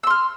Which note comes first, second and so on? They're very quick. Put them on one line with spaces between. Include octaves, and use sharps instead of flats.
E6 C6 F6